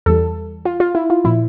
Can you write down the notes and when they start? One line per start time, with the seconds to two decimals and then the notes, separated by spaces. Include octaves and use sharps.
0.06 E2 E3 G3 A4
0.65 F4
0.80 F4
0.95 E4
1.10 F4
1.24 A#2 F3 E4